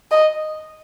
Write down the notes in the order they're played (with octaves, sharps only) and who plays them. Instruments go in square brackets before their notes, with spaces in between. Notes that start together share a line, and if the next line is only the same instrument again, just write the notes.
[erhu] D#5